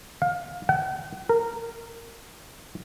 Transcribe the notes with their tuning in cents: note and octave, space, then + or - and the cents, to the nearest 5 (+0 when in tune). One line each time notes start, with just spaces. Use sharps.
F5 +30
F#5 +40
A#4 -15